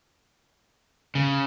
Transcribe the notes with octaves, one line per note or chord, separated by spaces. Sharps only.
C#3